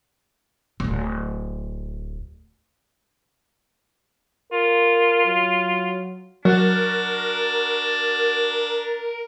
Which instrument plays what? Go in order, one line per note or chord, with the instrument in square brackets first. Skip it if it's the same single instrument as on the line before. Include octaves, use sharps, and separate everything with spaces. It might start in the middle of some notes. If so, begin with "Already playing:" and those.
[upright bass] D1 G#1
[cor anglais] F4 [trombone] A#4
[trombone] F#3
[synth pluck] F#3 [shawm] D4 [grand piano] F#4 [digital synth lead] A#4